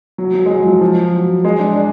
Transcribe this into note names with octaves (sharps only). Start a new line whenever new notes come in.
F#3
F#3
G#3
F#3
F3
F3
F#3
G#3
D4
D4